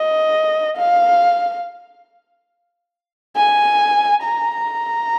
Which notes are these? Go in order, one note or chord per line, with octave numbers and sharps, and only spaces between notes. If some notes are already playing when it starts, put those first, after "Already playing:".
Already playing: D#5
F5
G#5
A#5